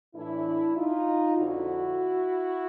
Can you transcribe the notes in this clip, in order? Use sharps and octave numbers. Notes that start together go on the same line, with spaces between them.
A2 E3 D4 E4
D#4 F4
F2 D3 F3 E4 F#4